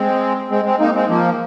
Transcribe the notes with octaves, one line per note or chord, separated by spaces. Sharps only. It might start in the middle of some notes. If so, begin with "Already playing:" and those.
Already playing: G#3 C4
G#3 C4
G#3 C4
A#3 D#4
G#3 C4
F3 A#3